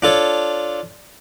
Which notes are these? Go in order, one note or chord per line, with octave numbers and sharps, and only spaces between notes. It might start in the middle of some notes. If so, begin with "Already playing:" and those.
D4 F4 A4 C#5